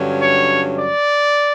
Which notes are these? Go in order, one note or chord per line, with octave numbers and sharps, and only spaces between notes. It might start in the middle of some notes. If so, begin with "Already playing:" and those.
Already playing: G2 D3 F#3 C#4
C#5
D5